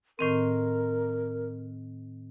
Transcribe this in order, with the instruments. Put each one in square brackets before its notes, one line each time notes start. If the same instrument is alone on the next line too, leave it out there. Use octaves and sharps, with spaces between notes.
[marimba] A2 D#3 C4 [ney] A#4